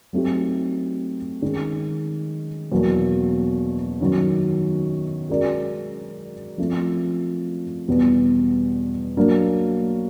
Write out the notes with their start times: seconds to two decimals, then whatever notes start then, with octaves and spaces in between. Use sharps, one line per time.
0.13 F#3 A3 C4 D#4 G4
1.42 D#3 G#3 C#4
2.72 E2 B2 F#3 A#3
4.00 F#2 D#3 F#3
5.29 G#3 C#4 F#4 A#4 D5
6.58 F3 A3 C4
7.88 E2 B2 G3 B3
9.17 F#3 A#3 D4